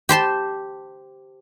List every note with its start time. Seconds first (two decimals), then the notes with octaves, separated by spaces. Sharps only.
0.09 G4 C5 A5 C6